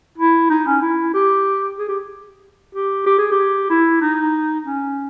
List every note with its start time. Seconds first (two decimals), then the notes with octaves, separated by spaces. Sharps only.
0.18 E4
0.50 D#4
0.67 C#4
0.82 E4
1.14 G4
1.79 G#4
1.89 G4
2.75 G4
3.06 G4
3.18 G#4
3.31 G4
3.70 E4
4.02 D#4
4.66 C#4